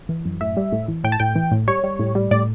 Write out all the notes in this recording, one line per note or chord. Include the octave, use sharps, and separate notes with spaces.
E3
F#2
A2 E5
G3
A2
E3
A2 G5
A5
A2 G5
E3
A2
G3 C#5
G3
A2
G3
A2 D5